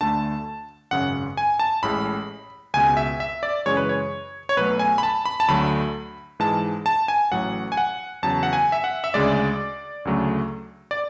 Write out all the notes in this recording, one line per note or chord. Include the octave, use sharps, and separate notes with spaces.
D2 D3 A3 A5
G#1 F#2 C#3 F#5
G#5
A5
A1 A2 G#3 B5
C#2 B2 G#3 G#5
E5
E5
D5
F#2 C#3 E3 G#3 C#5
B4
C#5
C#5
B1 B2 F#3 A3 B4
G#5
B5
A5
B5
A5
D2 D3 F#3 A3 B5
G#2 E3 G#3 A5
A5
G#5
A1 A2 F#3 F#5
G#5
F#5
E2 C#3 F#3 A5
F#5
G#5
E5
F#5
E5
D2 C#3 G#3 D5
D2 C#3 F#3 A3
D5